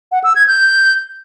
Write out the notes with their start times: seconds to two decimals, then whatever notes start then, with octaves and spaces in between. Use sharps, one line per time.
0.12 F#5
0.24 E6
0.36 G#6
0.47 G6